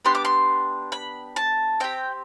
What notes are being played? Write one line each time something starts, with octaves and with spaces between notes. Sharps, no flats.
B3 D4 G4 C6
D6
C6
B5
A5
C4 G4 G5